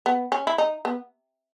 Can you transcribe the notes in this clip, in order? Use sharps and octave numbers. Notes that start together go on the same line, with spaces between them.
B3
C#4
E4
D#4
B3